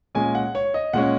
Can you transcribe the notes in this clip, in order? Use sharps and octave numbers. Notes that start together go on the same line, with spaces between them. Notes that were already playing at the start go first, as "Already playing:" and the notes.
A#2 G#3 C#4 G#5
F#5
C#5
D#5
A#2 G#3 C#4 F#5